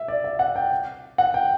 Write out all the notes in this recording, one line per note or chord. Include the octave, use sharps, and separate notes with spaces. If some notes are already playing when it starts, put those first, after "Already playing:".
Already playing: E5
D5
E5
F#5
G5
F#5
G5